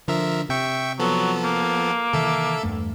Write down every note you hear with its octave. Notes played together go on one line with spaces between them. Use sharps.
D3 F3 A#4 E5
C3 E5 G5 C#6
F3 F#3 B3 A4
A#3
C3 D#3 E3 A4 E5
E2 G2 A3